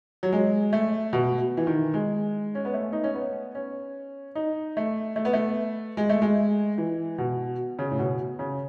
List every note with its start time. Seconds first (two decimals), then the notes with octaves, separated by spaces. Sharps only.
0.23 F#3
0.33 G#3
0.73 A3
1.13 B2
1.57 E3
1.67 D#3
1.94 G#3
2.55 C#4
2.65 B3
2.74 A3
2.93 D#4
3.04 C#4
3.14 B3
3.55 C#4
4.35 D#4
4.77 A3
5.16 A3
5.25 B3
5.33 A3
5.97 G#3
6.09 A3
6.22 G#3
6.78 E3
7.18 B2
7.79 C#3
7.91 A2
7.99 B2
8.39 C#3